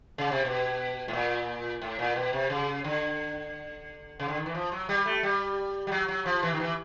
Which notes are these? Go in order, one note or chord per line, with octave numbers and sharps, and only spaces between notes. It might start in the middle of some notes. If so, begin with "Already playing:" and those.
C#3
C3
B2
A2
A#2
A2
A#2
B2
C3
C#3
D3
C#3
D3
D#3
E3
F3
F#3
G3
A3
G3
G3
F#3
F#3
F3
E3
D#3
E3